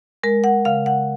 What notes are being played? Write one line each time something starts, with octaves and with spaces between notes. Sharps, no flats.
G#3 A#4
F#5
C#3 F5
F#5